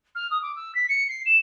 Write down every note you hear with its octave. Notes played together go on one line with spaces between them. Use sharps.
F6
D#6
D6
E6
B6
C#7
C7
E7